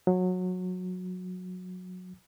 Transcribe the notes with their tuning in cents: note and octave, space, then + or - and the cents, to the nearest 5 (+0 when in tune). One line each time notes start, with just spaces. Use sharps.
F#3 -20